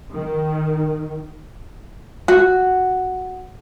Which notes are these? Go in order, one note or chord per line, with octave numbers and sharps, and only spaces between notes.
D#3
F#4